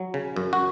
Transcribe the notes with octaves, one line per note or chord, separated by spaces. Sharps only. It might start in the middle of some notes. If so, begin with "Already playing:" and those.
Already playing: F#3
C#3
F#2
F#4